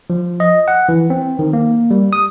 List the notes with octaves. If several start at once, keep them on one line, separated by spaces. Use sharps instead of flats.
F3
D#5
F#5
E3
C4
D#3
A#3
G3
D#6